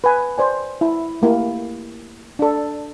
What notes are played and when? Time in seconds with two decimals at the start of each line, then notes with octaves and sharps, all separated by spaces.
0.04 B4 G#5
0.38 C5 D5 G#5
0.81 E4
1.22 A3 A#3 E4 G4
2.39 D4 A4